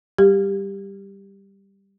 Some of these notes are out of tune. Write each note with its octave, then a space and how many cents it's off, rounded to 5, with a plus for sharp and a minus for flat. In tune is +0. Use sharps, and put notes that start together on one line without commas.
G3 +0 G4 +10